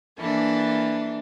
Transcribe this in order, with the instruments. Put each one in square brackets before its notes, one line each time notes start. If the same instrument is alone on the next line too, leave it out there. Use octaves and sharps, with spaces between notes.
[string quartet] E3 A#3 D4 A4